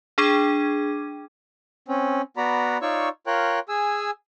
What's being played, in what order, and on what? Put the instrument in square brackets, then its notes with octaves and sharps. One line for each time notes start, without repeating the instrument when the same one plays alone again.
[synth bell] D4 G#4 G5 D6 G#6 D#7
[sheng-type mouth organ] C4 C#4
B3 F#4 D5 A#5 B5
D#4 F4 C#5 D5 C#6 E6
F4 A#4 C#5 G5 F#6
G#4 G#5 E6